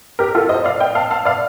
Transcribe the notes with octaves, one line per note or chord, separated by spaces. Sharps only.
G4 A#4
F4 A4
C5 D#5
D5 F5
D#5 G5
F5 A5
F5 A5
D5 F5